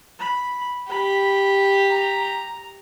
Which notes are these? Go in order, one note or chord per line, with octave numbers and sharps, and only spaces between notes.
B5
G4 B5
A#5